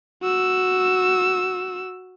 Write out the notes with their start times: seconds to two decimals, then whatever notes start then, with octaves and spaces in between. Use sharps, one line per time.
0.23 F#4 E6